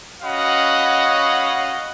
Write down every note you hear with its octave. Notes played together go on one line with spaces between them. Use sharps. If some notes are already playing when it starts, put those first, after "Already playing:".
C#4 F#4 D#5 F5 F#5 B5